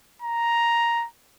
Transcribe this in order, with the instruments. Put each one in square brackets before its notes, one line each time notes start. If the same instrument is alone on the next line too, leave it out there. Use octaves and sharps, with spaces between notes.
[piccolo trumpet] A#5